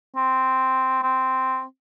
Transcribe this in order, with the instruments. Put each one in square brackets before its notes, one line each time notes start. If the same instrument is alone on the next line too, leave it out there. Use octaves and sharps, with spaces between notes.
[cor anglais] C4
C4